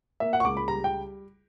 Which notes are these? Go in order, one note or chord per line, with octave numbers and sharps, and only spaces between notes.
A#3 E5
F#5
C#6
C#2 D6
B5
G3 A#5
G5